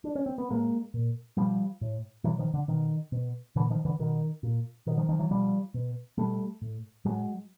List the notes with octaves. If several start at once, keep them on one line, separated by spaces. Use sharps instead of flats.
D4
C#4
C4
B3
A2 G#3 A#3
A#2
B2 F3 G3
A2
B2 E3 F#3
D#3 F3
D3
B2 D#3
B2
A#2 D3 E3
D#3 F3
D3 E3
B2 D#3
A#2
B2 D#3
D#3 F3
D#3 F3
E3 F#3
B2 F3 G3
B2
B2 G3 A3
A2
A2 F#3 G#3